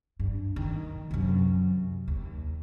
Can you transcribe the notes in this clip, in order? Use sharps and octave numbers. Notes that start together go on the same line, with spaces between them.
G2
D#3
F#2 C3
D#2